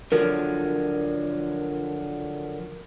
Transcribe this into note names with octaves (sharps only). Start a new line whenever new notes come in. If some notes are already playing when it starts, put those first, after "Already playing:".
D3 F3 F#3 A#4